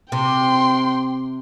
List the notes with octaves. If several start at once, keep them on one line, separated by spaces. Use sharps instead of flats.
C3 G5 C6